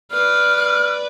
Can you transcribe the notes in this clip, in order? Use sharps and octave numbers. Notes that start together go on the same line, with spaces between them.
B4 D5 F6